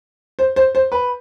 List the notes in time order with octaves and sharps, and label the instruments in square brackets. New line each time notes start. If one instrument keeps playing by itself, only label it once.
[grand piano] C5
C5
C5
B4